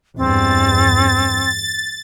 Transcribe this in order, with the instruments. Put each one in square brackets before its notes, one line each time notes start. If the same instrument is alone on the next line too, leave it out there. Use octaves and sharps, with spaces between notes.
[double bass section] E2 G2 [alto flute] C4 [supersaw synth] A6